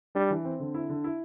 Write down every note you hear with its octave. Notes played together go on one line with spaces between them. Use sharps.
G3 D4
E3
C4
D3
E4
D3
E4